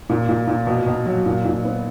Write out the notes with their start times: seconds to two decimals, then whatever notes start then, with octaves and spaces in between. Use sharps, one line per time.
0.09 A#2
0.29 A#2
0.47 A#2
0.67 B2
0.86 B2
1.06 F#3
1.26 A#2
1.45 A#2
1.65 B3